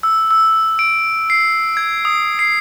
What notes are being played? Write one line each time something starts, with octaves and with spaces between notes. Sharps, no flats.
E6
E6
D7
C7
G#6
D#6
C7